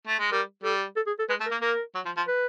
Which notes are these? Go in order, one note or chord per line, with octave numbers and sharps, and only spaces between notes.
A3
G#3
G3 A#4
G3 A4
A4
G#4
A4
G#3 B4
A3
A#4
A#3
A#3 A#4
F#3
F3
F3
B4